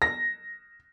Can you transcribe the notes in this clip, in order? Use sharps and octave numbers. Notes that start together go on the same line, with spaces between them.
A#6